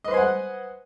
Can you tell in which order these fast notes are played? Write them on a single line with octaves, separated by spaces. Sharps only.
D#5 B4 C5 G#5 F#5